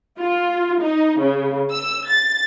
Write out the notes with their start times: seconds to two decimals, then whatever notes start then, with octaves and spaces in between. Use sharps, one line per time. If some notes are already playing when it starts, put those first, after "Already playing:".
0.18 F4
0.81 D#4
1.19 C#3
1.71 E6
2.08 A6